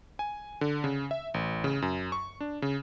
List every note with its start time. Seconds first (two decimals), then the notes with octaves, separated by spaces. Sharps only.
0.19 G#5
0.61 D3
0.84 C#3
1.11 E5
1.34 A1
1.64 C#3
1.82 F#2
2.12 C#6
2.40 D4
2.62 C#3